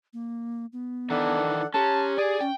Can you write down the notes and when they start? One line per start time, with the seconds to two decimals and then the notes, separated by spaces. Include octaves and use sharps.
0.13 A#3
0.73 B3
1.10 D#3 E3 D4 A4 F#5
1.74 C#4 G4 A5 A#5 C6 F#6
2.18 G#4 D5 G#5
2.41 C#4 G5